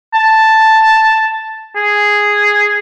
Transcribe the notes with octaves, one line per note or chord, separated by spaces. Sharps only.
A5
G#4